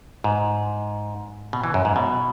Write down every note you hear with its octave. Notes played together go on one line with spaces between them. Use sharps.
G#2
B2
E3
F#2
G#2
B2